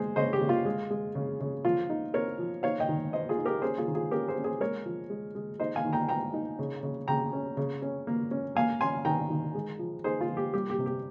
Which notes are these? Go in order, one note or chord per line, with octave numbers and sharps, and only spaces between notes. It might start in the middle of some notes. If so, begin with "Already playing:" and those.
Already playing: G#3 G#4 C5
C#3 C5 D#5
G4
C#3
F4
G#3
G#3
C#3
C#3
F3 F4
D#4
C4 A#4 C#5
F3
D#4 C#5 F5
D#5 G5
D#3
A#3 C5 D#5
F4 G#4
D#4
G4 A#4
C#4 G#4 C5
F4 G#4
D#3
F4 G#4
C#4 G4 A#4
G#4 C5
C#4
G#4 C5
G#3 A#4 C#5
F3
G#3
G#3
D#4 C5 D#5
F5 G#5
D#3
G5 A#5
A#3 G5 A#5
D#4
C#3
C#3
C#3 G5 A#5
C#4
C#3
C#4
A#3
C#4
A#3 F5 G#5
C#4 G#5 C6
D#3 G5 A#5
D#3
G#3
F3
D#4 G#4 C5
F4
F3
G4
G3 G4
G4
C3
G4